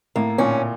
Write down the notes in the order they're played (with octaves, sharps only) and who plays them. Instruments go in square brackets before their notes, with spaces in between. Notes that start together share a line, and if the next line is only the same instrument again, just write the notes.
[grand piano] A2 [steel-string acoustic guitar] A#3
[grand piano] A#2 [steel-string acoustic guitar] C#4